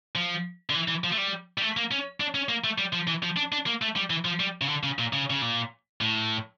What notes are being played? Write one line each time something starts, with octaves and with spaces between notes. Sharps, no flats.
F3
D3
E3
E3
F3
A3
G3
G3
A3
A#3
C#4
D4
C#4
A#3
A3
G3
F3
E3
F3
D4
D4
A#3
A3
G3
E3
F3
G3
C#3
D3
C#3
A#2
C#3
C#3
A#2
A2